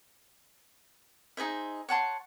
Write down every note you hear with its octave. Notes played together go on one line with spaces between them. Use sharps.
D#4 G#4 C5 E5
C#5 F#5 A5 C6